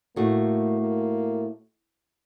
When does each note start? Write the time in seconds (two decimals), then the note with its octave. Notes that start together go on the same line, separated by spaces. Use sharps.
0.16 A2 A3 A#3 D#4 F#4
0.81 A#3